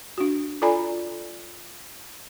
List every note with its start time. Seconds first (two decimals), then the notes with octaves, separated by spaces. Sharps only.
0.18 D4 F#4
0.62 F4 A4 D5 G#5 A#5 B5